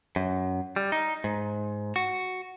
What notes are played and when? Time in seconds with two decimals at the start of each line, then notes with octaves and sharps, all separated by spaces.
0.16 F#2
0.76 G3
0.92 D#4
1.24 G#2
1.96 F#4